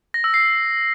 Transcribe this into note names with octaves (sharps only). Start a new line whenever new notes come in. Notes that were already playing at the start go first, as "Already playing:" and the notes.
A#6
E6
C7